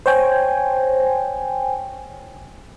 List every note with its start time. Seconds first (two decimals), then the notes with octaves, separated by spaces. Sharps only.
0.06 C5 C#5 G5 G#5